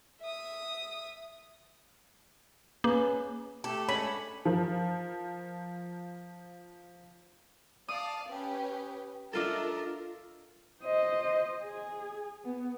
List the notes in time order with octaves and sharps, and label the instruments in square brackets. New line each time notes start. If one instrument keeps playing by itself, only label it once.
[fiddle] E5 D#6
[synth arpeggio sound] A#3 [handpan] C#4 G#4 B4
[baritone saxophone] A3 [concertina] G4 [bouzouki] A4
[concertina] G#3 D4 [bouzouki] C#4 [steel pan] B5
[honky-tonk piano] F3 A#4
[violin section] D5 F5 A5 [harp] D#6
[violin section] C#4 G4 B4
[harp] D4 F4 A4 [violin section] A#4 D#5 E5
[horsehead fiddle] C5 D#5
G#4
B3